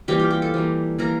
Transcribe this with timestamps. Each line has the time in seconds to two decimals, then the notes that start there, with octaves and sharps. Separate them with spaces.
0.08 E3 G3 A#3 G4
0.19 F4
0.31 G4
0.42 A4
0.54 E3 G3 A#3
0.99 E3 A#3 A#4